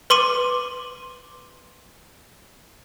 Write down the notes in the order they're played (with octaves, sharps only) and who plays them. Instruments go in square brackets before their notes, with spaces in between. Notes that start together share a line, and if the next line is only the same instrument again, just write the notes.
[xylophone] B4 C6 D6 D#7